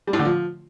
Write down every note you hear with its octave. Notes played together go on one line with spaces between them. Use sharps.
G3
A2
D3
F3